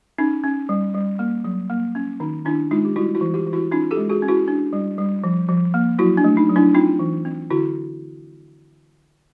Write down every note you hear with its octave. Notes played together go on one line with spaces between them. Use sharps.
C#4 D#4
C#4
G3
G3
A#3
F#3
A#3
C#4
D#3 D#4
D#3 D4 E4
G#3 D#4 F4
G4
G3 E4 F#4
E4 F#4
E3
F4 G4
E3
E4 F#4
C#4 D#4 F4
G4 A4
G#3
F#4 G#4
C#4
E4 F#4
D4
G3
G3
F3
F3
A#3
F#3 E4 F#4
D4
A3
D#4
F#3
D4 E4
C4 D#4 F4
E3
C4
D3 E4 F#4